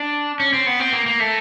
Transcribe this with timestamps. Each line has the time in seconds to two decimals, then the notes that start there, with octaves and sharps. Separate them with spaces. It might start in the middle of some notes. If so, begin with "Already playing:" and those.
Already playing: D4
0.40 C#4
0.53 C4
0.66 B3
0.80 C4
0.93 A#3
1.06 A#3
1.20 A3